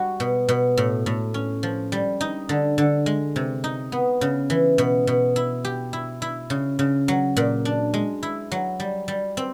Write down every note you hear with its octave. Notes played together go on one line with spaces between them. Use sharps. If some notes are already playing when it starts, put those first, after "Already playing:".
Already playing: G3 F#4
B2
B2
A2
A2
C#4
F3
G3
D#4
D3
D3
G#3
C3
D#4
B3
C#3
E3
B2
B2
E4
G4
E4
E4
C#3
C#3
F#3
A#2
D4
G#3
E4
F#3
G3
G3
C4